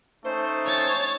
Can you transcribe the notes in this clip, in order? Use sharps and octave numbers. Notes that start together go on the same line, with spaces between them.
A3 C#4 D#4 C5
C#5 A6